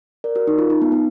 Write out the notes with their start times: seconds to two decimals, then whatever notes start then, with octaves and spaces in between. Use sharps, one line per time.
0.24 A#4 D5
0.36 F#4 A#4
0.47 D#4
0.58 F4
0.70 D#4
0.82 B3
0.92 B3